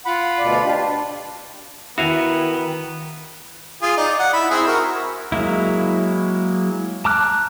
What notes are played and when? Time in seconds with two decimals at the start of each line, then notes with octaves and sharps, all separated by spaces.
0.05 F4 F#5 B5
0.39 D2 B2 D5
0.64 D4 G4
0.76 D4
1.98 D#3 B3 E4 F#4 F5 G#5
3.82 F4 G#4
3.97 D#4 D5
4.19 F#5
4.33 E4 B5
4.50 C4 E4 G#4
4.67 F#4 A#4
5.32 F#3 G#3 A#3 E4
7.05 A5 A#5 D6 F6 F#6